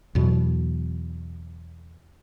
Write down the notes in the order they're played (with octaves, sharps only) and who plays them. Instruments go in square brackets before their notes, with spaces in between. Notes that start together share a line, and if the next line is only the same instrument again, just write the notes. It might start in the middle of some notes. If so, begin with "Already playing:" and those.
[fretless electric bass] E2 B2 F#3